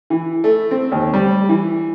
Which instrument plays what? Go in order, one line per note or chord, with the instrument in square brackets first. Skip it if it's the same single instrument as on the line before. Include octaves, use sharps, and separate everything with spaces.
[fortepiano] E3
A3
C4
D#2
G3
E3